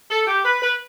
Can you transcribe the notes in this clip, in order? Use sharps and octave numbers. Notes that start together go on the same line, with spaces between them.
A4
G4
B4
B4